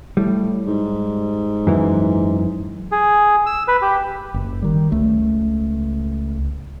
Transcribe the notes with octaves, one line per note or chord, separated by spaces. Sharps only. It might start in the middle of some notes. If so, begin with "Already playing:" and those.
A2 G3
G#2
F#2 E3
G#4
E6
B4
G4
F#1
D#3 G3
C#2 A3